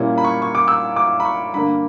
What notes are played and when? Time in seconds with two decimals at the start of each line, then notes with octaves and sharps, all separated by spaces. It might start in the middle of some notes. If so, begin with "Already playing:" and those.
Already playing: A#2 G3 A#3 C#4 E4
0.18 B5
0.24 C#6
0.42 C#6
0.55 D6
0.68 E6
0.96 D6
1.20 B5
1.25 C#6
1.54 G2 D3 A#3 B5